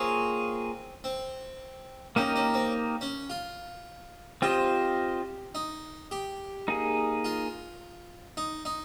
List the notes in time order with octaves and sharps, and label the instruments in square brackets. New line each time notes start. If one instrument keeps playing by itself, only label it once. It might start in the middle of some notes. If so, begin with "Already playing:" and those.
Already playing: [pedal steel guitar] A#3 F4 G#4 C#5 [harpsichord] C4
[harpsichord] C4
[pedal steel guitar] A#3 D#4 G4 A#4 D#5 [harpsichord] C#4
[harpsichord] C#4
C4
C#4
F4
[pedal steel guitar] C4 F4 C5 D#5 [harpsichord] G4
[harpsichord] D#4
G4
[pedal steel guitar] A#3 D#4 G#4
[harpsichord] F4
D#4
D#4